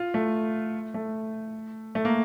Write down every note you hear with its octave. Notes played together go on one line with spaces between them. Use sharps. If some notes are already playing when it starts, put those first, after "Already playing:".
Already playing: F4
A3
A3
A3
A#3